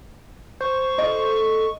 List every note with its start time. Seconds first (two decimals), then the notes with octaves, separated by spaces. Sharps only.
0.61 C5 C#6
0.98 D3 F4 A4 D#5